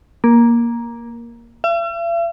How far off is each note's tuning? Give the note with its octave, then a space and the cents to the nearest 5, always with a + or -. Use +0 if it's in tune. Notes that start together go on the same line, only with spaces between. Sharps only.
A#3 +10
E5 +45